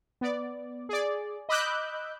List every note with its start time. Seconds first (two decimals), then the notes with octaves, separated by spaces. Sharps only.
0.21 B3 D5
0.89 G#4 D5
1.49 D#5 B5 D6 E6 F#6 G6